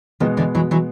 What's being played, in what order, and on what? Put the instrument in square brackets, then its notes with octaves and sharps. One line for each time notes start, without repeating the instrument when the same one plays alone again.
[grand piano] B2 G#3 B3 [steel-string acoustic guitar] D#3 F3
[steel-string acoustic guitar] D3 E3
E3 F#3
E3 F#3